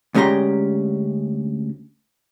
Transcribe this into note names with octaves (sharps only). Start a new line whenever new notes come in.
D2 G#3 C#4 G4 A#5 C6